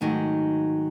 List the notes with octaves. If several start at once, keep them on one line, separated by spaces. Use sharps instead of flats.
G#2 D#3 F#3 A3 D#4